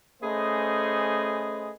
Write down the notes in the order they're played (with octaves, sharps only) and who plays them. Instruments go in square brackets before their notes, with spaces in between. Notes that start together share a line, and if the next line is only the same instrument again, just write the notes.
[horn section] A3 C#4 G#4 B4 C5 D#5